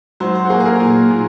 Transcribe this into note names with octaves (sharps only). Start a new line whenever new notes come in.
F#3 C5
C5
F#4
A#3 G#4
G#4
A#4
A#5
A#2 G#5
A#2